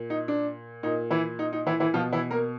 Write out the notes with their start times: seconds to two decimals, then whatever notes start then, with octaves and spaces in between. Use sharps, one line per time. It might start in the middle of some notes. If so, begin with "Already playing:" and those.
Already playing: A#2
0.10 D#4
0.28 D4
0.83 A#2 D#4
1.11 E3 E4
1.39 D#4
1.53 D#4
1.66 E3 E4
1.80 E3 E4
1.94 B2 F3 F4
2.13 E3 E4
2.31 A#3 A#4